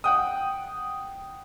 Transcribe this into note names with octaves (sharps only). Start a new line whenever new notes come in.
F#5 G5 D#6